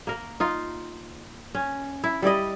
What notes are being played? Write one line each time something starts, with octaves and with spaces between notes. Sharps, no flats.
A#3 A#4
D#4 F4
C#4
E4
G3 E4 D5 D#5